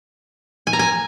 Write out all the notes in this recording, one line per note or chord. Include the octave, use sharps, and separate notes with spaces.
G#5
A#5
G#5